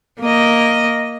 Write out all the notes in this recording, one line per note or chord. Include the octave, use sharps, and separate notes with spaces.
A#3 D#5